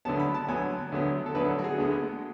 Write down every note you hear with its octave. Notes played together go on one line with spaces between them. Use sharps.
D2 D3 F#3 B3 A5
B5
A5
D2 D3 F#3 B3 G#5
D2 D3 F#3 B3
A4
D2 D3 F#3 B3 B4
A4
F#4
G#4
D2 D3 G#3 B3